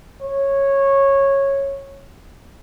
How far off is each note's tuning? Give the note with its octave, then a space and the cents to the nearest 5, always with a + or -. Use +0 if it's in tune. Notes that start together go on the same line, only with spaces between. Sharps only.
C#5 -10